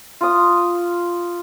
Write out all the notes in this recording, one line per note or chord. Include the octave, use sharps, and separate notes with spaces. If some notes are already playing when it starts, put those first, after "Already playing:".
F4 D#6